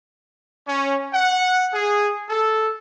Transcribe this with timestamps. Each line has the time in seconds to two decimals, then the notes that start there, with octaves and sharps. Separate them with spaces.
0.66 C#4
1.12 F#5
1.72 G#4
2.28 A4